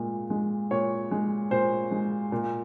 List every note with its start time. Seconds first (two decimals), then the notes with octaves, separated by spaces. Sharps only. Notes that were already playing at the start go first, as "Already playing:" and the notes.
Already playing: A#2 G#3
0.30 G#3
0.71 A#2 C#5
1.11 G#3
1.51 A#2 C5
1.91 G#3
2.32 A#2